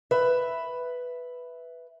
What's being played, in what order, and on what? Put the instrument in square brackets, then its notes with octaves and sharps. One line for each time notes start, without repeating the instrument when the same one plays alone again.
[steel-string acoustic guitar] B4 E5